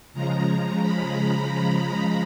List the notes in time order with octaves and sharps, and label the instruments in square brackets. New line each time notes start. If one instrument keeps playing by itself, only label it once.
[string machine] C#3 F3 G#3 A#5
B5
A#5